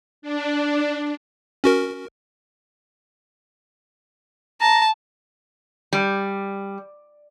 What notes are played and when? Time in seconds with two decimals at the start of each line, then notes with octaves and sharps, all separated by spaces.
0.22 D4
1.64 C#4 F#4 A#4
4.61 A5 A#5
5.93 G3